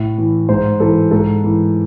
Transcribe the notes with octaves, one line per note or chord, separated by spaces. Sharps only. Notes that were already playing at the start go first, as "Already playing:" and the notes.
Already playing: A2
E3
G#2 C5
E3 A4
G#2 A4
E3